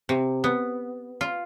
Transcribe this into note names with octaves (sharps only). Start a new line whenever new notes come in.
C3
B3
F4